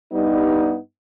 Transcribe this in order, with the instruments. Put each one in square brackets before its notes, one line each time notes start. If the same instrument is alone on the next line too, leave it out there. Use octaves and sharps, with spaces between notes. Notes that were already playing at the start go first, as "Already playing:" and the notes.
[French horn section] G2 G3 B3 D#4